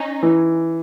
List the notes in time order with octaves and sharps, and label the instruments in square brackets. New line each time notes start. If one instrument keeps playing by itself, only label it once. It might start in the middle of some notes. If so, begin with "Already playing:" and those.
Already playing: [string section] C#4 D#4
[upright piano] E3